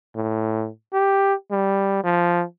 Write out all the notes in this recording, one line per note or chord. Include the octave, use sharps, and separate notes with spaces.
A2
G4
G3
F3